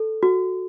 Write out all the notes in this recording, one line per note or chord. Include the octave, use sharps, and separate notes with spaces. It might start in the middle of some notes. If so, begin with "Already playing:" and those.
Already playing: A4
F#4